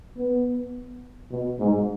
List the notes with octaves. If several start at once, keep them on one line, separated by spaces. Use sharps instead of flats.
B3
B2
G#2